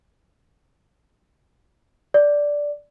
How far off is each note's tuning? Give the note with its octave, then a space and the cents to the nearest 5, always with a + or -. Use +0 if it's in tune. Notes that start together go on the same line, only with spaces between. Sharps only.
D5 -5